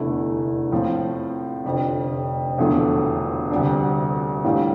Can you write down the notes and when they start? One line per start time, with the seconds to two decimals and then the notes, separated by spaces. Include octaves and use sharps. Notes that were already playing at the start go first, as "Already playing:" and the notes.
Already playing: F1 E2 D3 A3 E4
0.71 A2 F3 C4 F4
1.65 F1 F2 D3
2.58 E1 E2 D3 F3 A3
3.51 D2 C3 G3 D4
4.44 A2 E3 G3 D4 F4